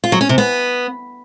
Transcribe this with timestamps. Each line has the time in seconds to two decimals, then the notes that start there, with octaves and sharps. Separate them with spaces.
0.04 F4
0.12 F#3
0.21 C#4
0.29 C3
0.38 B3